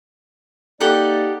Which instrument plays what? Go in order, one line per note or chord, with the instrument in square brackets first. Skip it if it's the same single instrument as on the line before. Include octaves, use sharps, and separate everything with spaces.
[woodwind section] A#3 D#4 D5 [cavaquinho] G4 A4 F#5